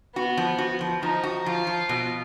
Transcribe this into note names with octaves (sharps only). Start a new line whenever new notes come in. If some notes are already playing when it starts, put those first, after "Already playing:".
B3 F#4
F3
F#4
F3
F3 D#4
F#4
F3 F4
F3
B2